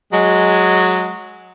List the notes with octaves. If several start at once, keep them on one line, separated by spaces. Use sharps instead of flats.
F#3 G#3